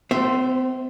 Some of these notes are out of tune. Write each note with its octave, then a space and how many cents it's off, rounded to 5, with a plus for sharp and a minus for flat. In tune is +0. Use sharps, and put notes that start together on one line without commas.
C4 -40 C5 +0 E5 +0